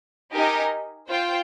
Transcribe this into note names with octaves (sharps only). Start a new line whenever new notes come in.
D#4 G4 A#4 D#5 G#5
F4 C5 G5